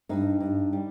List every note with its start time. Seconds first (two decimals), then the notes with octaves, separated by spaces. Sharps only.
0.09 G2 D#4
0.41 G2
0.73 G3